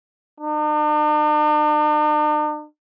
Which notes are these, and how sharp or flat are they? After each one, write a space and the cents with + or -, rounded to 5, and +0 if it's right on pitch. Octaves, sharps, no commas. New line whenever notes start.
D4 +45